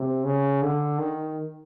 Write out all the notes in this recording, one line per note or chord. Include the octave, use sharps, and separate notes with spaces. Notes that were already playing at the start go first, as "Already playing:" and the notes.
Already playing: C3
C#3
D3
D#3